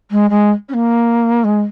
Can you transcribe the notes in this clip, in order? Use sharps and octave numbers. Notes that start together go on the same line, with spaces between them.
G#3
G#3
C#4
A#3
G#3